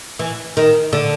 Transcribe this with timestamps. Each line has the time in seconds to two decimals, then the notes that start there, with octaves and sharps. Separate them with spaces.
0.19 E3
0.57 D#3
0.93 D3